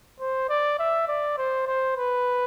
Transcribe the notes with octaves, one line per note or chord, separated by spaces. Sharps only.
C5
D5
E5
D5
C5
C5
B4